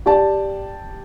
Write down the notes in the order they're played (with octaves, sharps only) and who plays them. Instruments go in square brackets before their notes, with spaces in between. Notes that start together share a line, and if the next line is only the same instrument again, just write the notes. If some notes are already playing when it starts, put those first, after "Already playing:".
[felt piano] G4 D5 A5